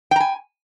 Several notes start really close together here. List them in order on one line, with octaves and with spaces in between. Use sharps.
G5 A#5 G#5